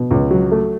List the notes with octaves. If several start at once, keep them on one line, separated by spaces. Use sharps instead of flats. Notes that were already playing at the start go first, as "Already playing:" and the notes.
Already playing: B2
C#2
F#3
A3